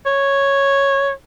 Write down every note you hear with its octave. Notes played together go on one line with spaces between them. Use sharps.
C#5